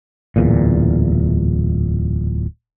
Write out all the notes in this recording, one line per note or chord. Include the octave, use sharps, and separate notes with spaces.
D1 E2 A#2